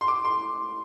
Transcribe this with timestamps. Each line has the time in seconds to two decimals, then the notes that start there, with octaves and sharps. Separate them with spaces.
0.01 C6
0.08 D6
0.24 C6